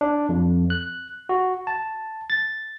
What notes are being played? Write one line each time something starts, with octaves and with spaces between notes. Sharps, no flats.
D4
F2
F#6
F#4
A5
A6